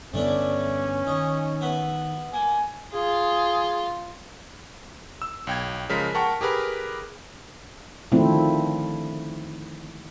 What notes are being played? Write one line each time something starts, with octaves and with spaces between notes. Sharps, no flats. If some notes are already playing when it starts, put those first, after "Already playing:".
G2 D3 A3 B3 C#4 D4 E4
D#3 D#4 C#6
B3 B4 E5
A#3 G#5
F4 G#4
E6
B1 G5 G#6
C#3 F3 G#3 A#4 B6
A#4 F#5 G5 A5 C#6
G4 G#4 A#4 B4
D3 D#3 F3 A3 C4 E4